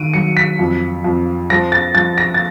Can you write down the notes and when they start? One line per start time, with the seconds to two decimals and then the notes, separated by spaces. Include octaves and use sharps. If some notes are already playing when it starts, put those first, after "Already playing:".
Already playing: D#3 D7 D#7
0.14 F#3 C#7
0.37 B6
0.59 F2
1.04 F2
1.50 F3 A#6
1.72 A6
1.95 F3 A6
2.18 A#6
2.34 A6